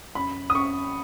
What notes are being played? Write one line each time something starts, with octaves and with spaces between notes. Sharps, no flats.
F#2 B5
D#6
F#2 C#6